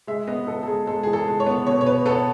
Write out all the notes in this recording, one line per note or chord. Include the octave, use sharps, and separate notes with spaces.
G#3 E5
B3 D#5
B3 A4
A4
G#3 G#4
G#3 A4
E3 G#4
A4
G#3
C#5
B3
B2 C#5
C#5
B3 B4
B3 A4